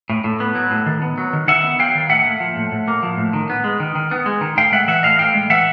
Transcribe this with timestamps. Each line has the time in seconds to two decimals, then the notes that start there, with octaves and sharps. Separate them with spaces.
0.10 A2
0.24 A2
0.40 B3
0.55 F#3
0.71 A2
0.86 D#3
1.02 B3
1.18 F#3
1.33 D#3
1.48 D#3 E5 F#5
1.64 B3
1.79 F#3 F5 G5
1.95 D#3
2.09 A2 E5 F#5
2.25 A#3
2.40 F3
2.56 A2
2.72 A2
2.88 A#3
3.03 F3
3.18 A2
3.33 D#3
3.50 B3
3.64 G#3
3.80 D#3
3.95 D#3
4.11 B3
4.26 G#3
4.41 D#3
4.57 A2 F5 G5
4.72 G#3 E5 F#5
4.88 E3 E5 F#5
5.03 A2 D#5 F5
5.19 A2 F5 G5
5.34 G#3
5.50 E3 E5 F#5